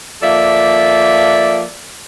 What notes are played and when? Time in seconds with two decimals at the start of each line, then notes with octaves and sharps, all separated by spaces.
0.22 F3 A#3 A4 D5 E5